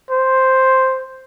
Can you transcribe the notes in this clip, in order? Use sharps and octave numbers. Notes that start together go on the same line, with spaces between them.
C5